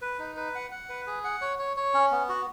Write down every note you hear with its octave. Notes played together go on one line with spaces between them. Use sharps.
B4
D#4
B4
F#5
F#5
B4
G#4
F#5
C#5
C#5
C#5
C#4
B3
F#4